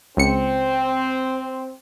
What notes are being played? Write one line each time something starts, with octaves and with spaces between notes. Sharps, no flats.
C#2 C4 C#7